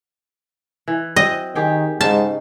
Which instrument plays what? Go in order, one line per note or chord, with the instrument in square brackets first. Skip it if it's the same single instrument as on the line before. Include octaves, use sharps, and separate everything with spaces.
[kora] E3
[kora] F#3 C4 [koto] D#5
[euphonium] D#3 [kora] G4 G#4 G5
[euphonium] G#2 [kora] C#3 D#4 [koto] A5